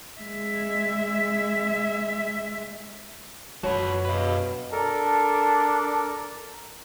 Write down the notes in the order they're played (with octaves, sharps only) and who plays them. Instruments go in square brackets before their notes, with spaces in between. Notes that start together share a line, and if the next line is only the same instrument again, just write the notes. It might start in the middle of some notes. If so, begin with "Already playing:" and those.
[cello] G#3 E5
[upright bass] F#2 [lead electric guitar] F3 B4 [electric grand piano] F#4 C#5
[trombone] B2 [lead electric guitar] B4 F5
[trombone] D4 [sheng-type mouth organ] A4 A#4